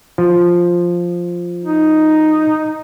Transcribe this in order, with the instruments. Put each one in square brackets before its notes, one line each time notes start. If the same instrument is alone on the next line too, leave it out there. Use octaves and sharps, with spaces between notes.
[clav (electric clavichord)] F3
[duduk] D#4